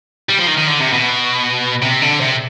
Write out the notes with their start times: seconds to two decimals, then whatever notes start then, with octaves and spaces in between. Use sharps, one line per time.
0.29 G3
0.39 F3
0.47 D#3
0.58 D#3
0.67 D3
0.80 C3
0.93 B2
1.82 C3
2.02 D3
2.21 C3